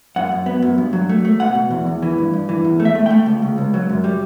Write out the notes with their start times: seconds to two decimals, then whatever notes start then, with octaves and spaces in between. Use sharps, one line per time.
0.16 F#2 F#5
0.32 F#2
0.46 B3
0.62 F#2
0.78 G2
0.93 F#3
1.09 A3
1.25 A3
1.40 B2 F#5
1.55 B2
1.71 E2
1.86 E2
2.02 E3
2.18 G2
2.33 G2
2.49 E3
2.64 E2
2.80 A3
2.85 E5
2.95 A3
3.06 A3 G5
3.26 C#2
3.42 C#2
3.58 C#2
3.74 F#3
3.89 F#2
4.04 G3